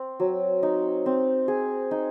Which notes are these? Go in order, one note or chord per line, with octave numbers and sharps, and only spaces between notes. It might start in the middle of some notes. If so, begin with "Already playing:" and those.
Already playing: C4
F#3
D#4
C4
G#4
D#4